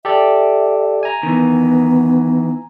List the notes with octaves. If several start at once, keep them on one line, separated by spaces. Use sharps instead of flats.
G4 A4 D5 E5
G#5 A#5
D#3 E3 B3